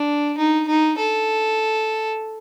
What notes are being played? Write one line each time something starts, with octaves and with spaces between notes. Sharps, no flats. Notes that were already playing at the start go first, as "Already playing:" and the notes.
Already playing: D4
D#4
D#4
A4